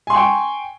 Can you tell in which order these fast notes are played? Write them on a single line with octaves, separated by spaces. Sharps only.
G#5 C6 C#6 G5